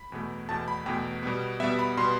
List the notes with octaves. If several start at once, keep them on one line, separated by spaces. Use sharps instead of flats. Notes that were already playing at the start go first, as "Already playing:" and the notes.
Already playing: B5
E2 B2 A3
E2 B2 A3 A5
B5
E2 B2 A3 G5
B2 G3 B3
B2 G3 B3 E5
B5
B2 G3 B3 C6